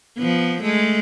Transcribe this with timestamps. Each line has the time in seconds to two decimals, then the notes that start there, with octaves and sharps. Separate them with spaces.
0.18 F3 B3
0.62 G#3 A3